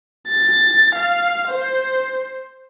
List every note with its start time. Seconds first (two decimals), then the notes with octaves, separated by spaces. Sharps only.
0.29 A6
0.95 F5
1.48 C5